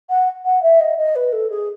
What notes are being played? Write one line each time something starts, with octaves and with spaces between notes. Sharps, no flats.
F#5
F#5
E5
D#5
D#5
B4
A4
G#4